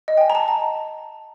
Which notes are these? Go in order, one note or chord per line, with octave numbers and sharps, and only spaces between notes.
D#5
G5
G#5
A#5
A5
A5